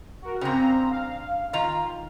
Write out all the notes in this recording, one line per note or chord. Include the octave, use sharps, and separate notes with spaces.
F#4 A#4
G2 C#3 C4 A#5
F5
D#3 F4 A#5